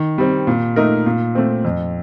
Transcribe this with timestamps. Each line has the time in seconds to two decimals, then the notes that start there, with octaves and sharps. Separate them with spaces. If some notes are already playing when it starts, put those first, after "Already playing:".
Already playing: D#3
0.18 G3 C4
0.47 A#2
0.76 A3 D#4 A#4
1.06 A#2
1.35 A3 C4
1.65 F2